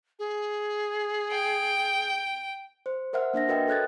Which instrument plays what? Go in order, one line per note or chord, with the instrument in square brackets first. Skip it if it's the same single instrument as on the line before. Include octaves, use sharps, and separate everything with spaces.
[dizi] G#4
[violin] G5
[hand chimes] C5
A#4 C5 E5 F#5 F6
A#3 D4 E5 A#6
F#4 A#4 B4 D#5 G5
A4 C#5 F#6 G#6 A6